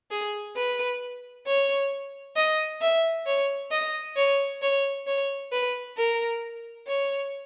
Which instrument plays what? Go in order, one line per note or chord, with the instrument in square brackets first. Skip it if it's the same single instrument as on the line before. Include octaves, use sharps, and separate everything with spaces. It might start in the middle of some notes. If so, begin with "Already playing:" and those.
[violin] G#4
B4
C#5
D#5
E5
C#5
D#5
C#5
C#5
C#5
B4
A#4
C#5